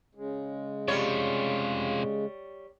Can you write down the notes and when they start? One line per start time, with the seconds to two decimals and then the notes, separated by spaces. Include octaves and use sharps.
0.15 C#3 G#3
0.88 C3 G3 F4 C#5